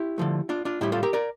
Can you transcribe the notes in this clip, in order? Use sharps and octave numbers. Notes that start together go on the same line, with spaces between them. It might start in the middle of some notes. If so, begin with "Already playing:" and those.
Already playing: E4 G4
D3 F3 A3
D4 F4
D4 F4
A2 G3 E4 G4
F4 A4
G4 A#4
A#4 D5